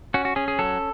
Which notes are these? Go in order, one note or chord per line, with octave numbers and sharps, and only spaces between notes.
C#4 F#4
F#4
C#4 G#4
G#4
F#3 A4